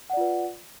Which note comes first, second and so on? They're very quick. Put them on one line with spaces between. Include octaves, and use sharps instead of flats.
F#5 D5 F4 B4